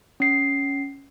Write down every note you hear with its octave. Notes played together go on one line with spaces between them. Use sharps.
C#4 C7